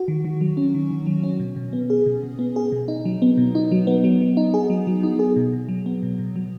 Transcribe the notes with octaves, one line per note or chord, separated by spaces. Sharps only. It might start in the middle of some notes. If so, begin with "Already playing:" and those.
Already playing: F#4
D#3
D#3
F#3
C#4
D#3
D#3
F#3
C#4
B2
B2
B3
G#4
B2
B2
B3
G#4
B2
D#4
F#3
B3
B2
D#4
F#3
B3
F#3
F#3
D#4
G#4
F#3
F#3
D#4
G#4
B2
B2
F#3
B3
B2
B2
F#3